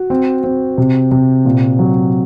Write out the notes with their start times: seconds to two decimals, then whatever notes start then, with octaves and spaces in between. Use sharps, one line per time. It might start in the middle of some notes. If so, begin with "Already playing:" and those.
Already playing: F#4
0.10 C4
0.44 C4
0.78 C3
1.12 C3
1.45 A#2
1.79 F#3